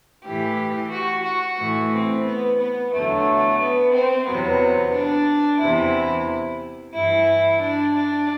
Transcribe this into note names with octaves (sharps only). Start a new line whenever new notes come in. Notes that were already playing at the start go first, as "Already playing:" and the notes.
A2 E3 G4
F#4
F#4
A2 E3
C4
B3
B3
E2 D3 F#3 A3
B3
C4
E2 C3 F#3 B3
D4
E2 C3 E3 E4
G2 E3 E4
D4
D4